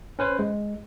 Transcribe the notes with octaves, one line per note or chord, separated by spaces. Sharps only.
C#4 B4 C5
G#3